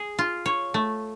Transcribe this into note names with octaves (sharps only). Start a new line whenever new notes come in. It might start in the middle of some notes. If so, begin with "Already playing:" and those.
Already playing: G#4
F4
C#5
A3